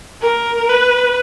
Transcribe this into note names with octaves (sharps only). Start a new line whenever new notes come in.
A#4
B4